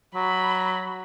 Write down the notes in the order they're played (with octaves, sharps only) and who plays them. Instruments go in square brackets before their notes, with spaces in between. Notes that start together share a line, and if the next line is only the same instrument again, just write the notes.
[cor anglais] F#3 [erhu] B5